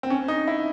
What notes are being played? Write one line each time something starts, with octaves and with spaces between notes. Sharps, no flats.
C4
C#4
D#4
E4